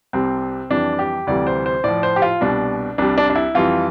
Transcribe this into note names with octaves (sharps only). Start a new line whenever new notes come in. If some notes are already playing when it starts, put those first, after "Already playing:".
C2 C3 G3 C4
F2 E3 G3 D4
G4
D2 C3 E3 G3 D5
C5
C5
A2 F3 D5
C5
G4
F4
C2 B2 G3 D4
C2 C3 G3 D4
D4
D4
E4
F2 E3 G3 F4